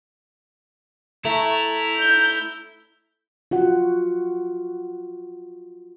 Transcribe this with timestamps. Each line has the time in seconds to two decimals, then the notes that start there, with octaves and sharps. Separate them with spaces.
1.25 A3 E4 A#5
1.99 G6
3.51 F4 F#4 F#5